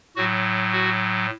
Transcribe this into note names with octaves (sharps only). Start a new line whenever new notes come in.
A2 F#3 F#4
F#4